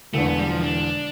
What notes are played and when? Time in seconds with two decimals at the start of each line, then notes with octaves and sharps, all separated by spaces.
0.14 E1 E2 D3 A3
0.26 B3
0.39 G3
0.50 F3
0.63 D4